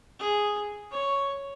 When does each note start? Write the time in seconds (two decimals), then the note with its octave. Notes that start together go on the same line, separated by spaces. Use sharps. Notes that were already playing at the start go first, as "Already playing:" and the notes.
0.20 G#4
0.92 C#5